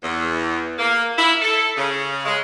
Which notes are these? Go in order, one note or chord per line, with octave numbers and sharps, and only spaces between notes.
E2
A#3
E4
A4
C#3
G#3